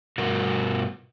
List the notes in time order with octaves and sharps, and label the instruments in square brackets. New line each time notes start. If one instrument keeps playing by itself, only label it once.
[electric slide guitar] G2 B2 F#4 A#4